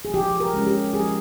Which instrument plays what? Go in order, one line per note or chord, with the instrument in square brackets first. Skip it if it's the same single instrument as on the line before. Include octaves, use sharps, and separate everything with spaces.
[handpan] G#4
F3 G4
A#4
G#3 C#4
G4
F3 G#4